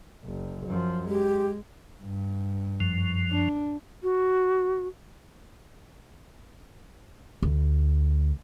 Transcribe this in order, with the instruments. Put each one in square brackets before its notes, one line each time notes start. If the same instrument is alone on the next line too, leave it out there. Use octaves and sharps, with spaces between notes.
[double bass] F#1
F#2 F3
[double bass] G#3 [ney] G4
[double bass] G2
[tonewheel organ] F#2 F3
[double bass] D4
[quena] F#4
[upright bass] D2